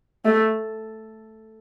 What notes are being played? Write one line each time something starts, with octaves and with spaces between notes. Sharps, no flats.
A3